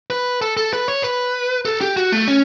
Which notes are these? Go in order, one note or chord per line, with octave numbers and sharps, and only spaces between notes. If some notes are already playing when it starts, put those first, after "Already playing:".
B4
A4
A4
B4
C#5
B4
A4
G4
F#4
A3
C#4